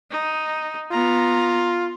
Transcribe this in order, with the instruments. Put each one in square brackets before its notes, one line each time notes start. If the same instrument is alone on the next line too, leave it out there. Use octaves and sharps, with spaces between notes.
[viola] D#4
[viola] B3 A#5 [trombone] F4